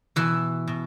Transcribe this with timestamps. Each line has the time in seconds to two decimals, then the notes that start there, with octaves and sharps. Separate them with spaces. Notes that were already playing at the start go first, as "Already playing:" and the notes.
0.16 B2 E3 E4
0.67 B2